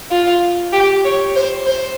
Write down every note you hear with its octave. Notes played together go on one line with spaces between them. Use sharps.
F4
G4
C#5
C5
C5